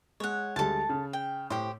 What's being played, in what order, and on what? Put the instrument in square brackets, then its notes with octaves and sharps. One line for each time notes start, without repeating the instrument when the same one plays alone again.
[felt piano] G#3 [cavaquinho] C#5 F#5
[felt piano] D2 G3 G#3 [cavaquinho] A4 A5
[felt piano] C#3
[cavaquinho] G5
[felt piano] A2 [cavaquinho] G4 C5